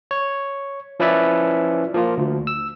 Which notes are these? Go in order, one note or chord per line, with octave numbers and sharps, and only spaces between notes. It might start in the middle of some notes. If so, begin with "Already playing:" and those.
C#5
F3 C#4 E4 B4 D5 E5
F3 A#3 F4
D2
E6